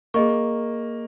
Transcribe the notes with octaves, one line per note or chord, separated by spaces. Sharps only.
A#3 G#4 D#5 C#6